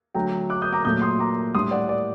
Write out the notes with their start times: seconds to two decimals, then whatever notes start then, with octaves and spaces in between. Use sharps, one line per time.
0.15 D3 F#3 A3 G5 A#5
0.50 D6 F#6
0.62 D#6 G6
0.73 A#5 D6
0.85 A#2 F#3 A3 D#6 G6
1.02 C6 D#6
1.19 A#5 D6
1.55 A2 G3 D4 C6 D#6
1.71 D5 F#5
1.89 D5